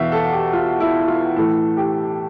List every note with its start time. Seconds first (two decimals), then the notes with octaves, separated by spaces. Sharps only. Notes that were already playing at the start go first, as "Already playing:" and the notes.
Already playing: E2 B2 E5 F5
0.12 A4
0.32 G4
0.53 F4
0.80 E4
1.08 F4
1.36 A2 E3 A4
1.77 G4